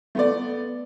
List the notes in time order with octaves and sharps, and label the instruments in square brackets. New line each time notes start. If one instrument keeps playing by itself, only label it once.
[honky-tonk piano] A3 B3 D5